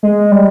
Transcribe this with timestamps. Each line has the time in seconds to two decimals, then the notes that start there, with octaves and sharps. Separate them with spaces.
0.03 G#3
0.32 G3